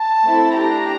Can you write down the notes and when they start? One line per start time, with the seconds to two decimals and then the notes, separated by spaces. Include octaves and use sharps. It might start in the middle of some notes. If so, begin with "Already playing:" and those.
Already playing: A5
0.23 A3 C4 E4 A4
0.54 D4 G4 A#5